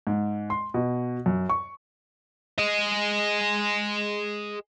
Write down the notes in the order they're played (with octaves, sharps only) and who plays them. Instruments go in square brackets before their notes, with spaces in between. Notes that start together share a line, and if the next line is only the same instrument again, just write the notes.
[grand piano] G#2
C6
B2
F#2
C#6
[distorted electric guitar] G#4 D#5